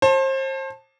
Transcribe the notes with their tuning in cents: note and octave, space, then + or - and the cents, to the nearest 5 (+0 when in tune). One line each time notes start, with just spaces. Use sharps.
C5 +35 A5 +5